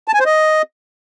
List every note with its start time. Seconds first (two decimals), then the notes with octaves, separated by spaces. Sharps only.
0.08 A5
0.14 G#5
0.20 C5
0.26 D#5